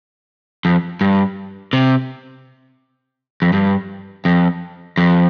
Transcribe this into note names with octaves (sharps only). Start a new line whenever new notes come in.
F2
G2
C3
F2
G2
F2
F2